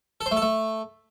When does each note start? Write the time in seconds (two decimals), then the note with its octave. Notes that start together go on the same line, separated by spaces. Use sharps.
0.21 A4
0.26 C5
0.31 A3
0.37 A4
0.42 A3